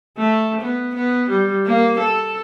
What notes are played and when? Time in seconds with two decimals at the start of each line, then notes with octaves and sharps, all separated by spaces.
0.18 A3
0.61 B3
0.95 B3
1.29 G3
1.66 A#3
1.99 A4